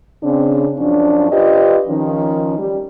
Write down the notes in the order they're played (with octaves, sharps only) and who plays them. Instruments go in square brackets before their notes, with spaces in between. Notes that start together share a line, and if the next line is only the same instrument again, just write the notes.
[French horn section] C#3 C4 D4
F#2 F3 C#4 D4
F4 G4 B4 C5 D5 D#5
D#3 F3 C#4
G3